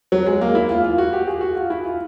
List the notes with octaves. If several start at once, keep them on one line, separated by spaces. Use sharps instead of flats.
F#3
G#3
A#3
E4
F4
F4
F#4
G4
G#4
F#4
F4
E4
F4